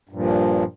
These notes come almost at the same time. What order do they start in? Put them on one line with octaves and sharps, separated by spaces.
G2 A#2 F3